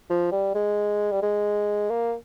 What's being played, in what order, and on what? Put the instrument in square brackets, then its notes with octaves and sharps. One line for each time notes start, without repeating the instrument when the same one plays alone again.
[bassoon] F3
G3
G#3
G3
G#3
A#3